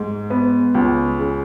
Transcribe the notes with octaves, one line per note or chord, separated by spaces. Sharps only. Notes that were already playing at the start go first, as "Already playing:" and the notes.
Already playing: G#2
B3
C#2
C#3